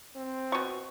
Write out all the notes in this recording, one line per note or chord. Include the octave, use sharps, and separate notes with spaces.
C4
B2 C#6